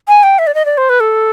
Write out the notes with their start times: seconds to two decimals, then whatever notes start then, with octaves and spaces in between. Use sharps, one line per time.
0.08 G#5
0.23 G5
0.39 E5
0.47 D5
0.55 D#5
0.65 D5
0.78 C5
0.89 B4
1.00 A4